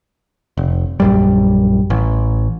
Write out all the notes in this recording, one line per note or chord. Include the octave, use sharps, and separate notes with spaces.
F1
A#1 F#2 G3
A1